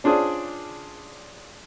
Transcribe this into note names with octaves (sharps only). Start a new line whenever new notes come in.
C#4 D4 F4 G#4 C5 D5